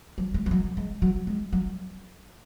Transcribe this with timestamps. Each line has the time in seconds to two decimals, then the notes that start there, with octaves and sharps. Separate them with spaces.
0.18 F#3
0.34 G#3
0.46 G#3
0.51 F#3
0.77 G#3
1.02 F#3
1.27 G#3
1.53 F#3